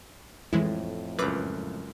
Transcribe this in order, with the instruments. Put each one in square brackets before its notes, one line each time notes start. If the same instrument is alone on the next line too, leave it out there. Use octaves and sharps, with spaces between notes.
[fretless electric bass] F2 A2 [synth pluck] E3 G#3 E4
[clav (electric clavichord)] C#2 F#2 [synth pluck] B4 D6